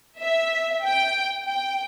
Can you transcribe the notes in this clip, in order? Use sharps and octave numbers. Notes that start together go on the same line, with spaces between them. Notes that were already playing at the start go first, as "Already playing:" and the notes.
E5
G5
G5